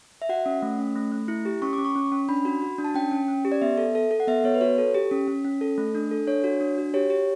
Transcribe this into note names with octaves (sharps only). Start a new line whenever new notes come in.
E5
F#4 F#5
C#4
A3
C#4
A3
A3
E4
G4
C#4 C#6
D6
C#4
C#6
C#4
C#4
D4 B5
F#4
F#4
D4
A5
C#4 G5
C#4
C#4
G4
D5
B3 E5
A4
A4
A4
F#5
B3 E5
B3 C#5
B4
F#4 C#5
A4
G4
C#4
C#4
C#4
A4
A3
D4
A4
D4 C#5
F#4
D4
F#4
G4 C#5
G4